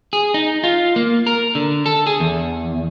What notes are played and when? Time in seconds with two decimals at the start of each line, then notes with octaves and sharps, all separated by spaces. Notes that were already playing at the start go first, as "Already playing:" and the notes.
0.13 G#4
0.34 D#4
0.64 F4
0.96 A#3
1.27 A#4
1.55 D3
1.86 A4
2.07 G#4
2.20 E2